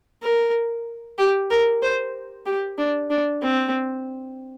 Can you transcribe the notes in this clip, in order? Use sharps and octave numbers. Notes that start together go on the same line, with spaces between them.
A#4
G4
A#4
C5
G4
D4
D4
C4